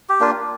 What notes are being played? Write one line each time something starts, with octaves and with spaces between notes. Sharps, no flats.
G4
A#3 D4 F4